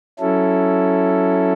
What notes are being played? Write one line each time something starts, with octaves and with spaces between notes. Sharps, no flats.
F#3 C#4 E4 A4